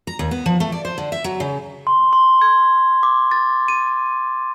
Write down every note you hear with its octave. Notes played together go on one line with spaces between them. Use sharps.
A#5
D#2
B3
F3
A3
D5
C5
D3
E5
F#3
C#3
C6
C6
G#6
D6
A6
D#7